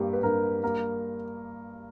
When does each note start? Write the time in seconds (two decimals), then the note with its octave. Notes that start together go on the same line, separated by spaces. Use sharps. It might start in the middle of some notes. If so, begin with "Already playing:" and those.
Already playing: G2 A#3 G4
0.13 B4
0.22 G2 A#4
0.63 A#3 A#4